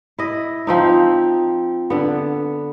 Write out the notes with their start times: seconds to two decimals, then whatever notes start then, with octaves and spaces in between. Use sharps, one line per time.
0.19 E4 D#5
0.67 F3 C4 D#4
1.90 D3 B3